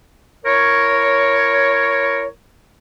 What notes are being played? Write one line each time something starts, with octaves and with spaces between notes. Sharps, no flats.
E4 A#4 C#5